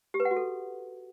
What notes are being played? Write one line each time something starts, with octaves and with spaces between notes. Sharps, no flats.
G4
B4
F#5
F#4
A4